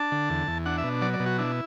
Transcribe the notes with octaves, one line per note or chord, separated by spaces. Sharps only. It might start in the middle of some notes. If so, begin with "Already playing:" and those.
Already playing: D4 A5
D3
E2
E2
D4 F#5
E5
B2
F#3 D5
D5
B2
F#4
D4 E4